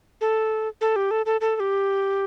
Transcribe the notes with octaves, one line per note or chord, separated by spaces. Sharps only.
A4
A4
G4
A4
A4
A4
A4
G4